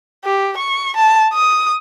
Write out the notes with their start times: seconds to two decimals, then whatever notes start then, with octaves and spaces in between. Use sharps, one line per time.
0.25 G4
0.58 C#6
0.96 A5
1.34 D#6